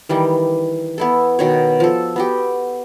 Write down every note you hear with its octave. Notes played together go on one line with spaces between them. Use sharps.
D#3 E3 G3
B3 E4 A4
B2 D#3 C#5
F3 A4
B3 F#4 G4